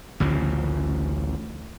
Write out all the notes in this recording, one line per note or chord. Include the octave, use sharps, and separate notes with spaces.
A1 D2 C#3 F3